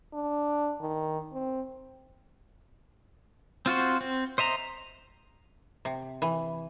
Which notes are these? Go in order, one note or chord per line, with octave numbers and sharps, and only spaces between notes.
D4
D#3
C4
C4 F4 F#4 C5
C4
C5 D#5 E5 A#5
C3
E3